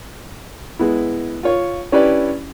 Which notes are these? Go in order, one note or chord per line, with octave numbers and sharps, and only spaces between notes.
G#3 B3 E4
F4 C#5
C#4 D4 E4 G4 B4 D5